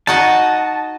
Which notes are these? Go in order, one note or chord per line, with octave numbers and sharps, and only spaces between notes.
D#4 F#4 D#5 A5